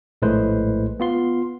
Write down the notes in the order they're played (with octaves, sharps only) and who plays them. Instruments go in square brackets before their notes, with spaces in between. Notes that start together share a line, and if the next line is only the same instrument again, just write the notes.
[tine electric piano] A#1 A2 G#3 A3 B4 C5
B3 F4 C6